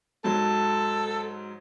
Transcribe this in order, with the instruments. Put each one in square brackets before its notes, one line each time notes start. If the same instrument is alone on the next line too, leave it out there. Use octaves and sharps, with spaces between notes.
[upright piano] G#2 F#3 [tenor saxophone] A4